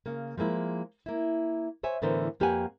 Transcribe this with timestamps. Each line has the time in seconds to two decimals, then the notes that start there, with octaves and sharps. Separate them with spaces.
0.06 C#3 A#3
0.37 F3 G#3 A#3 E4
1.06 A#3 E4
1.83 C5 C#5 E5 G#5
2.02 A2 D3 E3 B3 A#4 C5
2.40 F2 A#3 G4 B4 F#5 G#5